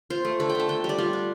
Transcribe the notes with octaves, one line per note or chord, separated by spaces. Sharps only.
F4 C5
A3
D3 A4
G5
A3 A5
D3 G5
G3
D5
G3 F4
D4